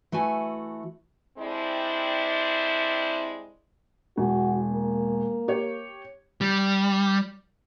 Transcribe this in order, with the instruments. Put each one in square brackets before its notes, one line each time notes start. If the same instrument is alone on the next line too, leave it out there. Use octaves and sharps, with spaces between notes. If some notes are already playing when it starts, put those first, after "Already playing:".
[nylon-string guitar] E3 A3 F#4 G#5
[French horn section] G3 G#3 C4 D4 E4
[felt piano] E1 [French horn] F#4
[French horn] A#3
[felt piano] G4 C#5
[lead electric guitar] G3